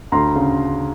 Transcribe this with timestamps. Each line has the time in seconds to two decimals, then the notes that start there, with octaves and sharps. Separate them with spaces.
0.12 D2 A#5 C6
0.36 C#3